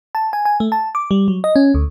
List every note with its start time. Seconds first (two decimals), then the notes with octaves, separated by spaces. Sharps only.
0.15 A5
0.33 G#5
0.45 G#5
0.60 A3
0.72 A5
0.95 D6
1.11 G3
1.28 F#3
1.44 D#5
1.56 C#4
1.74 D2